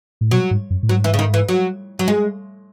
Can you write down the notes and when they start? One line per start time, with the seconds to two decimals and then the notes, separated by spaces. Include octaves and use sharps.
0.21 A2
0.31 B2 F#3
0.51 G#2
0.70 F#2
0.83 A2
0.89 G#2 F#3
1.04 E3
1.14 C#3
1.19 D#3
1.34 E3
1.49 F#3
1.99 F#3
2.08 G#3